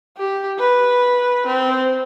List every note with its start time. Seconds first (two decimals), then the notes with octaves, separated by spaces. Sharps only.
0.18 G4
0.59 B4
1.47 C4